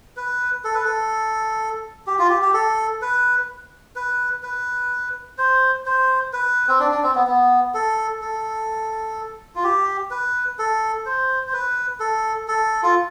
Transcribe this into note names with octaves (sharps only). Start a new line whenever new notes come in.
B4
A4
B4
A4
G4
F4
G4
G4
A4
B4
B4
B4
C5
C5
B4
C4
D4
D4
C4
B3
B3
A4
A4
F4
G4
B4
A4
C5
C5
B4
A4
A4
F4